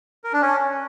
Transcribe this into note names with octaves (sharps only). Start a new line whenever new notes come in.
A#4
D4
C#4